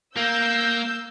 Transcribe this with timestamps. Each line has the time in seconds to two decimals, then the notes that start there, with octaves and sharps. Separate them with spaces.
0.17 A#3 E6 G6